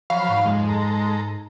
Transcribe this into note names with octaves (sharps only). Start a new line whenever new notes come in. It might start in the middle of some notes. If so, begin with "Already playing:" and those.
F3 F#3 C#5 F5 B5
G#2
F2 G#3
A4 A#5